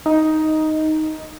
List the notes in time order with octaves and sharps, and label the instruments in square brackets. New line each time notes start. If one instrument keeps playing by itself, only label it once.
[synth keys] D#4